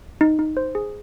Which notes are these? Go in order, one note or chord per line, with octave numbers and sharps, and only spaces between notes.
D#4
D#4
C5
G#4